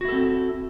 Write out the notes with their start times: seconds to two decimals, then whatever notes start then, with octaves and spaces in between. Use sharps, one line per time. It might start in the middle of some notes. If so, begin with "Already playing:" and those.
0.01 F#4
0.05 E4
0.08 A4
0.12 C4